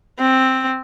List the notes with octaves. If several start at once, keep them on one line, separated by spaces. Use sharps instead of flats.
C4